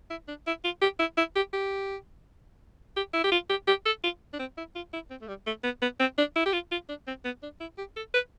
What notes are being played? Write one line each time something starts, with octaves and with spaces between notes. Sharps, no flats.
E4
D4
E4
F4
G4
E4
E4
G4
G4
G4
E4
G4
F4
G4
G4
A4
F4
D4
C4
E4
F4
E4
C4
A3
G3
A3
B3
B3
C4
D4
E4
G4
F4
F4
D4
C4
B3
D4
E4
G4
A4
B4